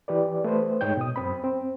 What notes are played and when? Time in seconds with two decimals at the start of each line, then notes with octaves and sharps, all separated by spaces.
0.08 E3 G4 B4 D5
0.44 A3 B4 C5
0.81 G#2 D#4 C#5 G5 G6
0.97 B2 D#6
1.16 F#2 C4 B5
1.44 C4